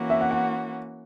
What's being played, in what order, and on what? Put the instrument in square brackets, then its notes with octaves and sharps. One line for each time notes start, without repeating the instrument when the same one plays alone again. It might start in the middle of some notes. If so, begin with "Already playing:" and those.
Already playing: [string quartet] E3 A#3 C#4 F#4
[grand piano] E5
F#5
F#5